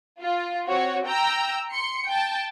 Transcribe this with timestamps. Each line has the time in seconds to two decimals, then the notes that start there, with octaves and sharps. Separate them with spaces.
0.20 F4
0.67 C4 F#4 C#5
1.07 G5 A#5 E6
1.72 C6 C#7
2.07 G5 A5